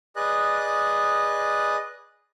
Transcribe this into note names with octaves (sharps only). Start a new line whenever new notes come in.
G#4 B4 D5 D#5 F#6